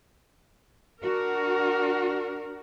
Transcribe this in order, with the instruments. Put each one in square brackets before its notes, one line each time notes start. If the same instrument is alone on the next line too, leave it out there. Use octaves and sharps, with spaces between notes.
[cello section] D4 F#4 [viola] A#4